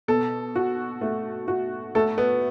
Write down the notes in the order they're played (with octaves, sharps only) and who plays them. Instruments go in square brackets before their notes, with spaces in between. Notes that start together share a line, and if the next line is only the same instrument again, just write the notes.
[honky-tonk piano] B2 [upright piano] A4
[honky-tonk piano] F#4
A3
F#4
[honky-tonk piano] A3 [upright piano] A4
[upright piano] B3